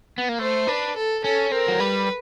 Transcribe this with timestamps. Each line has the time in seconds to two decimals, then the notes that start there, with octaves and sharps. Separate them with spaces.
0.18 B3
0.29 A#3
0.39 A3 C5
0.68 D4 B4
0.96 A4
1.24 C#4 A4
1.51 C4 A#4
1.68 F#3
1.79 G3 B4